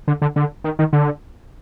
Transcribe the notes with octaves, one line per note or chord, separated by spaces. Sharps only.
D3
D3
D3
D#3
D#3
D3